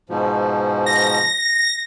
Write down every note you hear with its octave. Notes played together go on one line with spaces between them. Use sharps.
G#2 B2 F3
A#6